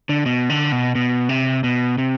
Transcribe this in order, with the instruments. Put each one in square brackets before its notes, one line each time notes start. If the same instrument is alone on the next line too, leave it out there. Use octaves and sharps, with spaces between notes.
[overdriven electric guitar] D3
B2
D3
B2
B2
C3
B2
C3